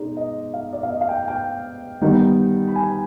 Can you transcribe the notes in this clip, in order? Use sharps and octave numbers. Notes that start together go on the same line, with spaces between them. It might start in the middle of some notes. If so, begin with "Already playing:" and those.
Already playing: B2 G#3 D#4 D5
D#5
F5
D5
F5
D#5
F5
G5
G5
D#3 G3 B3 D#4
B5
G#5